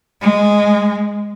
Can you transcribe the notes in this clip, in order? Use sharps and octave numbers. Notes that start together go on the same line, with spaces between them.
G#3